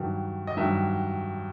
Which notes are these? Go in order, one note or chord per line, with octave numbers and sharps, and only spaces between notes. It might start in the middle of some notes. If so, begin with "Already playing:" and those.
Already playing: G2 D#3 F#3
D#5
G2 D#3 F#3 E5